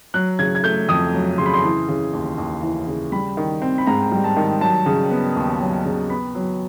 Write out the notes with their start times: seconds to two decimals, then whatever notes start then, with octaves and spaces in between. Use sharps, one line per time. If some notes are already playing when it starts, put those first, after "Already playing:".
0.14 F#3 F#6
0.39 C#3 G#6
0.55 G#6
0.64 A3 G6
0.89 F2 D#6
1.14 F#3
1.38 C#3 C6
1.46 B5
1.53 C6
1.64 E3
1.88 C#3
2.13 D#2
2.38 D#2
2.63 E3
2.88 C#3
3.12 G3 B5
3.37 D#3
3.62 C4
3.78 B5
3.87 G#2 A#5
4.12 G3
4.24 A5
4.37 D#3
4.61 F#3 A5
4.86 C#3
5.11 B3
5.36 D#2
5.60 F#3
5.85 C#3
6.10 B3 B5
6.35 F#3